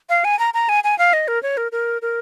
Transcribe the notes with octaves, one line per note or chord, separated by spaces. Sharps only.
F5
G#5
A#5
A#5
G#5
G#5
F5
D#5
A#4
C#5
A#4
A#4
A#4